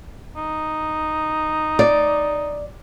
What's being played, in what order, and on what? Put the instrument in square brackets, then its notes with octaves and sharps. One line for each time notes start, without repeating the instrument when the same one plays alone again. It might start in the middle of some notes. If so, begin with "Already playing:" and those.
[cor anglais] D#4
[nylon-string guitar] D5